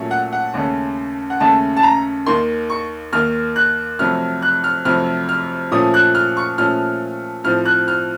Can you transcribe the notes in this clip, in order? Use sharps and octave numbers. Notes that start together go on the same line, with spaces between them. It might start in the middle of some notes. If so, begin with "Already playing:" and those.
Already playing: A#2 F#3 A3 C#4
F#5
F#5
D#2 C#3 A3 C#4
F#5
D#2 C#3 A3 C#4 A5
A5
A#5
D#2 D#3 A#3 C6
C#6
D#2 D#3 A#3 F6
F#6
F2 C3 F#3 A3 F6
F#6
F6
F2 C3 F#3 A3 F6
F6
A#2 F3 A3 C#4 D#6
F#6
F6
C#6
A#2 F3 A3 C#4 F6
A2 F3 C4 F6
F#6
F6